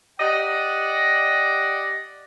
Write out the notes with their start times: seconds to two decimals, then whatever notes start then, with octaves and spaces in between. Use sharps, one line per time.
0.19 G4 D5 D#5 F#5